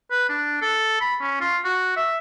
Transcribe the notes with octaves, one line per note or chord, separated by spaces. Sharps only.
B4
D4
A4
B5
C#4
F4
F#4
E5